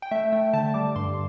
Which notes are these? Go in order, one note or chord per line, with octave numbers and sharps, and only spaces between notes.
G5
A3 E5
A3 G5
D3 A5
G3 D6
G2 C6